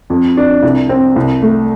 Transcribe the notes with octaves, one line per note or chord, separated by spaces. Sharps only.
F2
D4
C2
C4
C2
A3